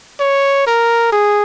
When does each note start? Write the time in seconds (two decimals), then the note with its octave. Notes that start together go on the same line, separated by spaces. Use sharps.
0.20 C#5
0.67 A#4
1.12 G#4